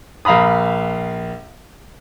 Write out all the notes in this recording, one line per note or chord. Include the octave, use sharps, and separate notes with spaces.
A#1 F5 A#5 B5 D#6